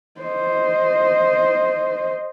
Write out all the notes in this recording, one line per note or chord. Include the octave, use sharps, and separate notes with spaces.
C5 D#5